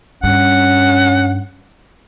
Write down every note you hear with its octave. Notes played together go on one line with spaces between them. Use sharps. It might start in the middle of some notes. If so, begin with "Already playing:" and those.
G2 C#4 F#5